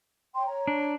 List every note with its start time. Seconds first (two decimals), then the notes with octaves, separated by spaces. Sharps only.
0.35 C#5 G5 C6
0.47 C#5 A#5
0.67 D4